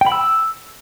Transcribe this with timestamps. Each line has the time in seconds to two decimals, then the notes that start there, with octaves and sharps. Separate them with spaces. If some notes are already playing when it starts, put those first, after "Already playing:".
0.01 G5
0.06 B5
0.12 E6